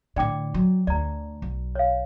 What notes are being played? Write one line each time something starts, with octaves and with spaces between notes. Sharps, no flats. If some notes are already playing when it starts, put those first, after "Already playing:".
A2 D3 D5 G5 D6
F#3
D2 D5 A#5
B1
C#5 F5